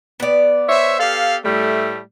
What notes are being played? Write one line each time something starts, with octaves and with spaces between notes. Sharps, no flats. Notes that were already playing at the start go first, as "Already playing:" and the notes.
B3 D5
C5 C#5 E5
G4 A4 F5
A2 G3 A3